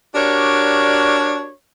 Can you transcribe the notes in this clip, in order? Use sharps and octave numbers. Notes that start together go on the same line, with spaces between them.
D4 F#4 G4 A#4 C#5 D5